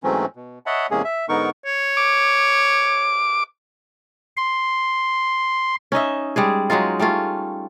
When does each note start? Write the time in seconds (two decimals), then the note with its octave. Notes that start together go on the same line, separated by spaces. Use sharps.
0.04 G#2 E3 F#3 A3 C4 C#4
0.36 B2
0.66 C#5 D#5 E5 F#5 A5 B5
0.91 E2 C3 G#3 A#3 C#4 G#4
1.04 E5
1.29 G#2 D3 B3 D#4 A#4 C#6
1.66 C#5
1.97 D6
4.37 C6
5.92 C#4 D#4 D#5 E5
6.36 G3 G#3 G#4
6.70 F#3 G#3 D#4 F4
7.00 G3 A3 C#4 F4